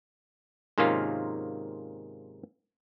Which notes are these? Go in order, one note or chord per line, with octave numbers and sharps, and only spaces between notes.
G#2 C3 D#3 A#3 C#4 F4